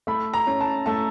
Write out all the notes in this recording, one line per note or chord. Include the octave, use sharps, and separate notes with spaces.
A3 B5
A#5
C#4
A5
A3 A5